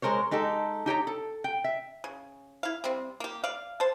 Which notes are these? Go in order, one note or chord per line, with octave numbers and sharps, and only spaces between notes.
G#3 A#4 C5 C#5
G#3 D#4 G4 A4
D#4 G4 C#5 A#5
A4
G5
E5
C#3
E4 F5
C3 G3 C4
A#3 G4
D5 F5
C5 A5